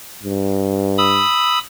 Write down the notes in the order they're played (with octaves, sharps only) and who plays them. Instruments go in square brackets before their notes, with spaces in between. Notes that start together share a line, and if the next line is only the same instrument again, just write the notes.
[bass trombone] G2
[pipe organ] B5 D#6 E6